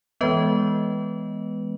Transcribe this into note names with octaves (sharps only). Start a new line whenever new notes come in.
E3 G#3 B3 B4 D#5